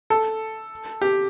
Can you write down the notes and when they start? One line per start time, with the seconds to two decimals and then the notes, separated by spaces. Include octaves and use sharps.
0.10 A4
1.02 G4